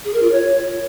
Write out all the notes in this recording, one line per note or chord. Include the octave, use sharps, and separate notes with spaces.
G#4
A#4
F4
C#5